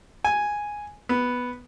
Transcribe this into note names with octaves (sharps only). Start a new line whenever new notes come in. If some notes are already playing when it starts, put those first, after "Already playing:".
G#5
B3